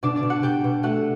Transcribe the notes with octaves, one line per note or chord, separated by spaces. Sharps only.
B2 D4 D5
D4 D5
B2
F#4 F#5
B2 G4 G5
B2
A3 F#4 F#5